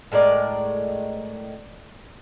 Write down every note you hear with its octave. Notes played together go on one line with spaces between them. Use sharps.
A2 G#3 A#4 D5